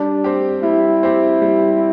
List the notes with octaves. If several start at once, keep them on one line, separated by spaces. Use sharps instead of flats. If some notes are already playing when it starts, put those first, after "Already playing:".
Already playing: G3 D4
C4 G4
G3 E4
C4 G4
G3